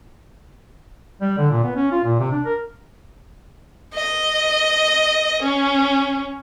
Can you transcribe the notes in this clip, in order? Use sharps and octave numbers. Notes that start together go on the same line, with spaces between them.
G3
D3
A#2
B3
C#4
F4
A#2
C3
D4
A#4
D#5
C#4